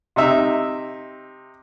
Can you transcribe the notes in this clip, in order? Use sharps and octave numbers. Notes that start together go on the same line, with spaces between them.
C3 D#4 E5